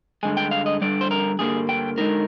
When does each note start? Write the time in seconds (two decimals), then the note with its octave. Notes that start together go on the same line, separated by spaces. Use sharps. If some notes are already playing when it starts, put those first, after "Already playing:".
0.23 G2 D3 G#3 G#5
0.37 G5
0.51 F5
0.66 D#5
0.81 G2 D3 G3 D5
1.01 C5
1.11 A#4
1.39 G2 D3 G3 A#3 G#4
1.69 G5
1.98 D3 G#3 D#4 A#4